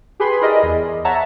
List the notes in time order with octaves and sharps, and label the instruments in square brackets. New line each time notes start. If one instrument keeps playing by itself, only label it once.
[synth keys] G4 G#4 B4 B5 C6
E4 G#4 A#4 D5 D#5
E2
C#5 E5 F#5 A5 A#5